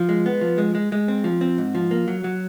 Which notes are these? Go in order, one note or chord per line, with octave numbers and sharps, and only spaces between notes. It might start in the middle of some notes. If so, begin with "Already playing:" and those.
Already playing: F3
G#3
B3
F3
G#3
G#3
G#3
C4
F3
C4
G#2
F3
A#3
F#3
F#3